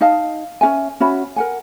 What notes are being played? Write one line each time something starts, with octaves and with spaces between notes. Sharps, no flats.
D#4 D#5 F5 A5
C#4 F#4 E5 G#5
C#4 F#4 E5 B5
A#4 F#5 G#5